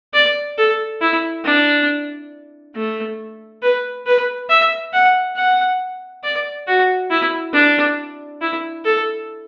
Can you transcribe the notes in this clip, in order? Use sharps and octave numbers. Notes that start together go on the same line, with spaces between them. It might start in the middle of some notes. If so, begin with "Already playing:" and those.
D5
A4
E4
D4
A3
B4
B4
E5
F#5
F#5
D5
F#4
E4
D4
E4
A4